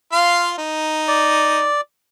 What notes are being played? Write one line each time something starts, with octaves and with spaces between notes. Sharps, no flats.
F4 F5 C6
D#4
D5